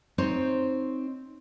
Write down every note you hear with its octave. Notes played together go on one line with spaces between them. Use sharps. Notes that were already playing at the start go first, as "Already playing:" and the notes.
C4 D#4 C5 C#5